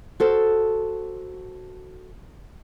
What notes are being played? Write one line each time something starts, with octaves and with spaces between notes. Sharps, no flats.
F#4 A4 C5